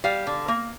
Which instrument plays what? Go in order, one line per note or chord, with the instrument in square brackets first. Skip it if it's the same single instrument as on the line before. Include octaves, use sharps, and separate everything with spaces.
[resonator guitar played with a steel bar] G3 F5
D3
A#3